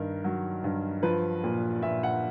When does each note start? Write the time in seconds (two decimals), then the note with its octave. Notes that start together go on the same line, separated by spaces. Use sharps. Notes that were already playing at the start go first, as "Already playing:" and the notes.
Already playing: G2 D#3 A#4
0.24 F#3
0.64 G2
1.03 F3 B4
1.44 A#2
1.83 A#2 E5
2.03 F#5